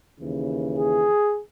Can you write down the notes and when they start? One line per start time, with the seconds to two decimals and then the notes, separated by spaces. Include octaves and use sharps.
0.20 D#2 C#3 E3
0.77 G#4